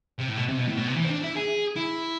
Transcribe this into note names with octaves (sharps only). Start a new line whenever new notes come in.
C3
A2
B2
C3
B2
A2
B2
C3
E3
C4
D4
E4
G#4
E4